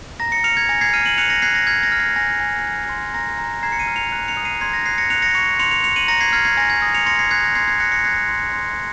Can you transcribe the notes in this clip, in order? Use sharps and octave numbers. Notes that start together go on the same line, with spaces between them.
A#5 A#6
A#6 C#7
F6 C#7 F7
G#6
G#5 A#6
G#6 C7
F6 C7 D#7
D#7 F#7
F#6 C#7 F7
A#6 C#7
F#6 G#6 C7
A#6
F6 G#6
A#6
F6
G#6 C7
G#5 A#6
G#5
F#6
C6
A#5 A#6
A#5
A#5 G#6 C7
C#7
C7 D#7
F6
C#7 F7
F#6
C#7 F7
D#6
C7 D#7
C6 G#6 C7
A#6
F#6 G#6 C7
A#6 C#7
F#6 C#7 F7
A#6 C#7
C#6 C#7 F7
C6 C#7 F7
C#7 F7
C6 C#7 F7
D#7 F#7
A#5 A#6 C#7
G#6 C7
F6 G#6 C7
G#6 C7
G#5 A#6
G#6
D#6 A#6
C#7 F7
C6 A#6 C#7
G#6 C7
F#6 G#6 C7
A#6
C6 G#6 C7
G#6 C7
F#6 A#6 C#7
A#6 C#7
F#6 G#6 C7
C6
C6